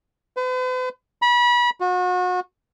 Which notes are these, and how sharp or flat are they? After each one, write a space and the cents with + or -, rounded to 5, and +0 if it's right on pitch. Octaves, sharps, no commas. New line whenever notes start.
B4 +45
B5 -30
F#4 -35